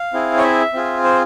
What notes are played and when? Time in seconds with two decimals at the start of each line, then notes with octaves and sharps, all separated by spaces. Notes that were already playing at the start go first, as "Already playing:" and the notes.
Already playing: F5
0.13 C4 E4 G#4
0.38 C#5
0.43 E5
0.73 C4 F4 G#4
1.04 C5